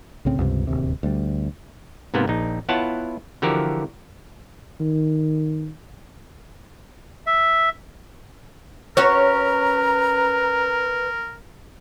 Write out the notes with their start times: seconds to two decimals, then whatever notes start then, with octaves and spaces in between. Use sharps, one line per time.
0.25 C2 A2 C#3 C4
0.39 C#2 G2 C3
0.67 D1 A#1 D#2 C3
1.03 D2 G3
2.14 G#2 C3 A#3 B3
2.28 A#1 D#4
2.69 B3 E4 F4 C#5 F#5 A5
3.42 D3 E3 F3 F#4 G4 A#4
4.80 D#3
7.26 E5
8.97 C#4 F#4 A#4 B4 C#5 A#5